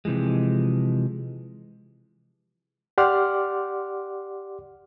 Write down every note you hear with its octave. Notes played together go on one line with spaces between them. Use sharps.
C3 E3 F3 G#3
G4 D5 F#5 C6 D6 F6